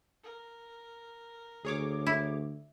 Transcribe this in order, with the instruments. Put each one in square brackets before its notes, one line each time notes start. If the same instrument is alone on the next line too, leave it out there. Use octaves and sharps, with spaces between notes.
[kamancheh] A#4
[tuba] D2 [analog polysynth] G#4 C#5 D6
[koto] E4